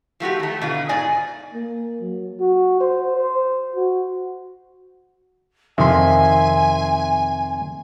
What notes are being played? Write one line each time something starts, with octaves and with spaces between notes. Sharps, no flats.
F3 A3 F#4 G4
D#3 A3
B2 D3 F4
G#2 D5 D#5 G#5
A#3
F#3
F#4
C5
C5
F#4
F2 C3 D#3 E5 G#5 C6